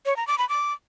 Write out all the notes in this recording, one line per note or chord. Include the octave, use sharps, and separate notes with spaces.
C#5
A#5
D6
B5
D6